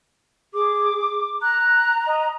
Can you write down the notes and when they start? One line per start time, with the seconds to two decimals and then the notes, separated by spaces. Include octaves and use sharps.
0.54 G#4 D6
1.42 A#5 F#6
2.06 D#5